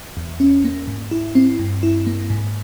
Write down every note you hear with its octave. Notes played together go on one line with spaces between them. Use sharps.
E2
C#4
A#3
G#2
E4
C4
G2
E4
A#3
G#2